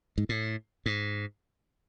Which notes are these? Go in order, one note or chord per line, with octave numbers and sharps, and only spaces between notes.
G#2
A2
G#2